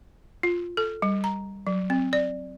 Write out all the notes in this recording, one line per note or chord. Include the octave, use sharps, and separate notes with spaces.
F4
A4
G3
A#5
F#3
C4
D5